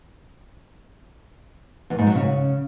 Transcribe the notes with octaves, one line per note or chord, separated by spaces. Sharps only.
E2
G#2
F#3
C#3